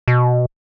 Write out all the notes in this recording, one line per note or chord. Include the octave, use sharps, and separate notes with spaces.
B2